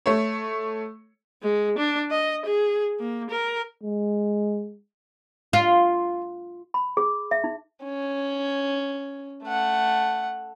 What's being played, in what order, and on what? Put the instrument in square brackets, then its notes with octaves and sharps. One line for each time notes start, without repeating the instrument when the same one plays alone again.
[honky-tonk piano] A3 C#5
[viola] G#3
D4
D#5
G#4
A#3
A#4
[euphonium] G#3
[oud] F4
[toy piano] B5
G#4
E5
D#4
[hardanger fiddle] C#4
A3 F#5